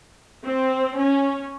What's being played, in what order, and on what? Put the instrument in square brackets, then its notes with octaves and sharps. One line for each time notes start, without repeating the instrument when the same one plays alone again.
[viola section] C4
C#4